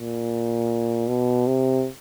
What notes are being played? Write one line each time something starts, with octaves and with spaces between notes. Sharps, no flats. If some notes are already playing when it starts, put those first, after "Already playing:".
Already playing: A#2
B2
C3